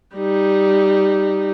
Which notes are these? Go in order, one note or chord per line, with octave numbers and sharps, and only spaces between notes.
G3 D#4